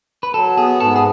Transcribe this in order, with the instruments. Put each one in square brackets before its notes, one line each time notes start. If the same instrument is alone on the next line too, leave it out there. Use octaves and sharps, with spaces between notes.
[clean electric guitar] B4
[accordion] F#3 [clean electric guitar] A4
[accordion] B3 [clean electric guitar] G#4
[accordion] G#2 [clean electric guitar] A4
[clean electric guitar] G#4